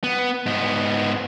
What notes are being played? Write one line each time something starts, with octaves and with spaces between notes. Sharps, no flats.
B3
G#2 B3